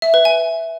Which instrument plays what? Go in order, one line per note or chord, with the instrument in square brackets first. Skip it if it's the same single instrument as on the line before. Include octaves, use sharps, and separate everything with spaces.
[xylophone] E5
B4
G#5